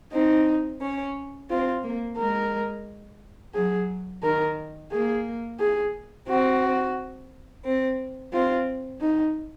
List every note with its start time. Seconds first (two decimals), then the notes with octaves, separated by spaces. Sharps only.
0.13 C4 D#4
0.82 C#4
1.50 C4 F4
1.84 A#3
2.18 G#3 A#4
3.54 F#3 G#4
4.23 D#3 A#4
4.91 A#3 G#4
5.59 G#4
6.28 C4 F#4
7.64 C4
8.33 C4 F4
9.02 D#4